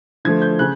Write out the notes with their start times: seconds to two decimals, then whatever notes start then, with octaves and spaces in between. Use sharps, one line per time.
0.25 D3 F3 A3 G#6
0.42 G6
0.59 C#3 F#6